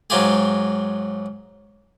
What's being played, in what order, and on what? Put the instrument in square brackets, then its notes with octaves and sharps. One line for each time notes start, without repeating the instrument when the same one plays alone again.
[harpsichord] G#2 F#3 F4 G4 G#4